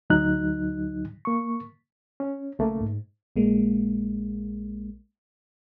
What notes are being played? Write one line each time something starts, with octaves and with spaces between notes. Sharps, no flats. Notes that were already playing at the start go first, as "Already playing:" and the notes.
D2 F#3 D#4 F#6
A#3 C#6
C#4
B1 C#3 A3 A#3
G#2
A#1 G#3 A#3